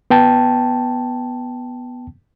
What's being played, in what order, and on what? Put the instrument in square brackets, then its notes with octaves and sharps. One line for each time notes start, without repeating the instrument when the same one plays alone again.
[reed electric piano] B3 G5 A5